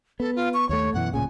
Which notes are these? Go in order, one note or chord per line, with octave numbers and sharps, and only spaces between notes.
B3 A4
F4
C#6
D#2 A3 C#5
F#2 B2 E3 F#5
D1 A#2 C#3 G#5